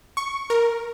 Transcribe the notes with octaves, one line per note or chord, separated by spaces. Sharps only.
C#6
A#4